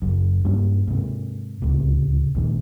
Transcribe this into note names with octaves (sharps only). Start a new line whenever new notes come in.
F#1 F#2
G2 G3 A#3 C#4
G#2 C3
D1 C#2 C3
A#1 D#2 G#2